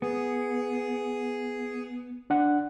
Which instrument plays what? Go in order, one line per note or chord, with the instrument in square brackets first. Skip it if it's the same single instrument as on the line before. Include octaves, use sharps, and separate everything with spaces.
[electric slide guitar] B3 [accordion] G#4
[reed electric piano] D4 F#5